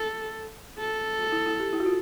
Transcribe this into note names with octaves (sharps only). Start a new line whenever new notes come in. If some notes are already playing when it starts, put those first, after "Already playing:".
Already playing: A4
A4
E4
E4
G4
E4
F#4
F4